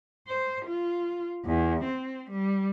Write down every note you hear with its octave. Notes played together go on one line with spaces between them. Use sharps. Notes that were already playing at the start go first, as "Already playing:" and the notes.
C5
F4
E2
C4
G3